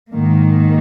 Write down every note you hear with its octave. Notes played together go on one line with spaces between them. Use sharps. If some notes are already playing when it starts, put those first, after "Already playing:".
G#2 D#3 A#3